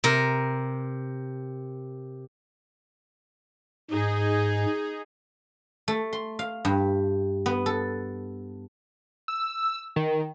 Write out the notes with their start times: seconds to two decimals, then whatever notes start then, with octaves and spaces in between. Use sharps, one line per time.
0.04 C3 A#4
3.90 G#2 D#4 G#4
5.88 A3
6.13 C6
6.39 F5
6.65 G2
7.46 B3
7.66 A4
9.28 E6
9.96 D#3